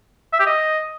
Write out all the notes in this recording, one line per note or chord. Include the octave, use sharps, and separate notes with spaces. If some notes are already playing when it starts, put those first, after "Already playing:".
E5
G4
D#5